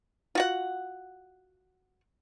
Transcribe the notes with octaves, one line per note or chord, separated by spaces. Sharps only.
F4 F#4 F#5